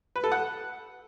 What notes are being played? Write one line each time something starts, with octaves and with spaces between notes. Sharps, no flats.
B4
A4
F#5